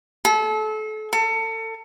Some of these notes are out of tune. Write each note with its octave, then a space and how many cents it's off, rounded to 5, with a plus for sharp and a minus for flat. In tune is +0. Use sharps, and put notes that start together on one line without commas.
A4 -30
A4 +30